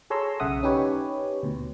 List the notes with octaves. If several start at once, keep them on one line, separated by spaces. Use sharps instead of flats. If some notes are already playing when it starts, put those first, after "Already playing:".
G#4 A4 C#5 A#5 C6 E6
B1 C#3 E5 F#5 D#6
C#4 D#4 G4 B4 C#5
D2 B2